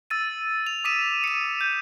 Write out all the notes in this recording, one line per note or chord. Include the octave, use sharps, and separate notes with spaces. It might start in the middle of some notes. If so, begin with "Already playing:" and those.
E6 A6 D#7
F7
D6 D#6 B6 D#7 E7
C#7 D#7
G6